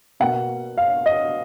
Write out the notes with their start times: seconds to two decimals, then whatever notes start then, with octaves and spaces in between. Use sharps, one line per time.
0.20 B2 A#3 F#5
0.78 F5
1.06 D#5